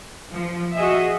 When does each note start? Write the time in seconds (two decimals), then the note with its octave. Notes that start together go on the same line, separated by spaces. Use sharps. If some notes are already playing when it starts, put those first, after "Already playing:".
0.30 F3
0.76 F#4 G#4 D#5 E5